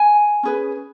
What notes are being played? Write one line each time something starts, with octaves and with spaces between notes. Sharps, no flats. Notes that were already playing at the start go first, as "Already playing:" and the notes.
Already playing: G#5
C#4 G#4 B4